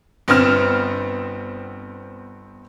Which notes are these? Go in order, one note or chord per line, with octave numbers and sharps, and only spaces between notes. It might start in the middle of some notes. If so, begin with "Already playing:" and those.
G1 B3 C4 F6 E7